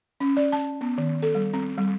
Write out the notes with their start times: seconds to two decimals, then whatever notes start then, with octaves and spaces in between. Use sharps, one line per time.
0.20 C#4
0.37 D5
0.52 A5
0.81 B3
0.98 D#3
1.22 A4
1.35 G3
1.54 C4
1.78 G3